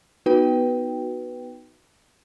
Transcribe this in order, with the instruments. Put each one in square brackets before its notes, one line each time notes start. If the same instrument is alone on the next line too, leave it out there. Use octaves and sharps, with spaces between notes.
[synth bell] B3 D#4 F#4 B4 G5